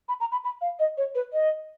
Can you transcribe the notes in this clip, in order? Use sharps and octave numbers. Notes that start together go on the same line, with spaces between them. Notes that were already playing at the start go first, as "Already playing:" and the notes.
B5
A#5
B5
B5
F5
D#5
C#5
B4
D#5